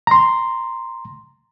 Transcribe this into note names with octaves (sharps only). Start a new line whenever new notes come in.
A#5 C6